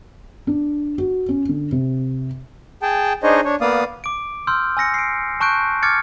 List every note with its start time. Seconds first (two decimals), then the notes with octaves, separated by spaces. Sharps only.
0.47 D4
0.98 F#4
1.29 C#4
1.49 D3
1.72 C3
2.82 G#4 G5 A5
3.23 D4 D#4 G#4 C5 C#5 D#5
3.45 D4 C#5
3.61 A#3 B3 D5 F5 D#6
4.04 D6 D7
4.47 C6 E6 F6 G6
4.77 G#5 E6 A#6 C#7
4.94 C7 D7
5.40 A5 C#6 F#6 G6 D7
5.83 D6 F6 G#6 A6 C#7